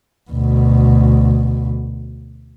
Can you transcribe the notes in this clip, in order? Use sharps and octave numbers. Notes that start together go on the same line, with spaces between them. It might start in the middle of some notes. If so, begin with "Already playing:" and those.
D2 B2